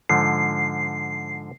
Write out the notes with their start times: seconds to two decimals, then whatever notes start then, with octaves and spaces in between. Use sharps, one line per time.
0.09 G#2 D3 F3 C7